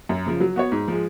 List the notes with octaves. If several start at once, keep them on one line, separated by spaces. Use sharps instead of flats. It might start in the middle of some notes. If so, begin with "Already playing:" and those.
F#2
C#3 F3
F#3
B3 F#4 C#5
G#2
F3 G#3